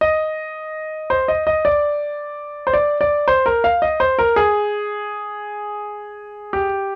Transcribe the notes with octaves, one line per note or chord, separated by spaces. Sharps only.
D#5
C5
D#5
D#5
D5
C5
D5
D5
C5
A#4
F5
D#5
C5
A#4
G#4
G4